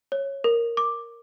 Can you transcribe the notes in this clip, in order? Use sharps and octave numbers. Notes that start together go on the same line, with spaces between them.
C#5
A#4
D6